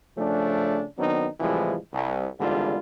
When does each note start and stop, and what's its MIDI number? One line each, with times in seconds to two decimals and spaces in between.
0.17 0.84 49
0.17 0.84 53
0.17 0.84 57
0.17 0.84 61
0.17 0.84 62
0.98 1.27 51
0.98 1.27 54
0.98 1.27 59
0.98 1.27 60
0.98 1.27 62
0.98 1.27 63
1.40 1.76 45
1.40 1.76 48
1.40 1.76 52
1.40 1.76 53
1.40 1.76 55
1.40 1.76 56
1.93 2.28 36
2.40 2.78 32
2.40 2.78 40
2.40 2.78 44
2.40 2.78 50
2.40 2.78 55
2.40 2.78 65